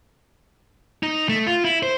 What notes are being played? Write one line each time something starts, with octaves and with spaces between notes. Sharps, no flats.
D#4
A3
F4
E4
C5